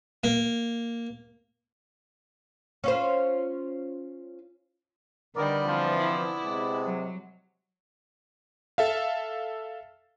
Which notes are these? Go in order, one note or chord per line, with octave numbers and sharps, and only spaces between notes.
A#3
C#4 F4 C5
D3 D#3 G3 B3 A#4 D5
C3 E3 F3
E4
C3 G#3
F#3
A4 E5 F5